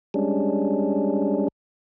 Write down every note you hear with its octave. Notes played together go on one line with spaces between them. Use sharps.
G3 G#3 C#4 D4